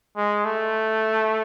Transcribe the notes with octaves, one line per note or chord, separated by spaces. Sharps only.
G#3
A3